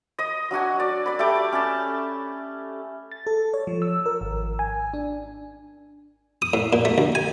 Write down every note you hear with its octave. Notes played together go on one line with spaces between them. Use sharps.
D#5 D#6
F#3 D4 F#4 G#5
D5
D5 B5
A3 G4 B5 D6
C#4 A5
A6
A4
C#5
F3
E6
A#4
G#1
G#5
D4
D#6
A2
A#2
A3
D2
G#5